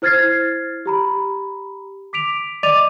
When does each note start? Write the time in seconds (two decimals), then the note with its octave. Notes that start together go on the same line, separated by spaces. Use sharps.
0.02 E4 C5 F6 G#6 A6 C7
0.86 G4 A#5 B5
2.13 D6 B6 D7 F7
2.63 D5 D#5 D6 A6 D#7 F7